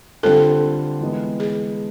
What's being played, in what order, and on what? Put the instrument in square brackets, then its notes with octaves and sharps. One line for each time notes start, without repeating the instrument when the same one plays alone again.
[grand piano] D3 G3 C4 F4 [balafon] A4
[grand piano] E3 G#3 B3
[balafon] G#4